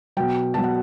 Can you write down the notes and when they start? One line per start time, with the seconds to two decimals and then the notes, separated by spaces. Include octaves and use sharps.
0.17 B2 F#3 G5
0.54 B2 F#3 A5
0.64 F#5